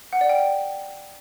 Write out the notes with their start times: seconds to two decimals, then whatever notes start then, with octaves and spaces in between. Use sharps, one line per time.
0.13 F#5
0.21 D5
0.29 G5